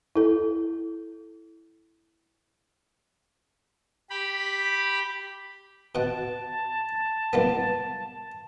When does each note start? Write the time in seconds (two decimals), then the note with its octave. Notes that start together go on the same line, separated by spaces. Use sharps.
0.16 E4 A4
4.10 G4 B5
5.95 B2 F#5 A5
7.33 C2 A#3 B3